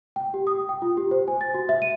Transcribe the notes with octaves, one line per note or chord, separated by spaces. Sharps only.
G5
G4
D#6
G5
F4
G4
C5
G#5
A6
F#4
E5
D#7